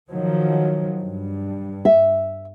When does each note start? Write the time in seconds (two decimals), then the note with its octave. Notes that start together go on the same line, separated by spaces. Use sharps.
0.10 D#3 F3 F#3
0.99 G2
1.85 E5